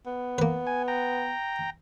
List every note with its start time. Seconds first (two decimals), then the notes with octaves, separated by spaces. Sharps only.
0.06 B3
0.38 A#3 B4
0.67 G#5
0.88 G5 A#5